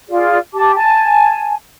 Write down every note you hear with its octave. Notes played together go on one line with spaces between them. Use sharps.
F4 G#4 D5
G4 A5 D6
G#5 A5